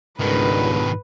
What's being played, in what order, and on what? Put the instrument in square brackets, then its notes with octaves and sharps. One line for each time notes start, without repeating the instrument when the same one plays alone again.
[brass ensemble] G1 C#2 D3 [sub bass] G#2 [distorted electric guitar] B2 D#3 [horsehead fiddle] B4